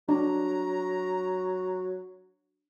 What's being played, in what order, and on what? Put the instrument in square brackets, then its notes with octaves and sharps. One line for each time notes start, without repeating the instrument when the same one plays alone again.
[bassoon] F#3 [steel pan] D4 [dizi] A#5